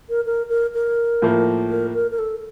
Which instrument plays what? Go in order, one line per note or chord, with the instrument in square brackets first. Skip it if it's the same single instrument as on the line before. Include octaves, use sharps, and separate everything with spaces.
[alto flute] A#4
A#4
A#4
A#4
[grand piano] A2 F3 A#3
[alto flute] A#4
A#4
A#4
A4